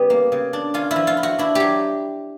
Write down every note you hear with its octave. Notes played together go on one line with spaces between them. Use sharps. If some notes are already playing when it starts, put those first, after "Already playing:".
Already playing: C#3 G3 B3 G4
A#3
C#3
D4
C#4 F4
E4
F3
F4
E4
F#4
D4 E4
F#3 G4